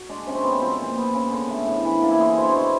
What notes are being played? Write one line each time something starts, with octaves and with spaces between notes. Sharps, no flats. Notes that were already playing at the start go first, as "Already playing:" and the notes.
Already playing: F#4
G#3 D4
C3 C#4
C4
C3 B3
C4
F3 C4
A#2
B3
C#3
D3
A3
A2
E3
A#3 D4
E4
D3 G#4
B2 C5
C#5
B2 C5